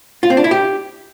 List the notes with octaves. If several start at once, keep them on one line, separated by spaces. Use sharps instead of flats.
F4
C4
D4
E4
G4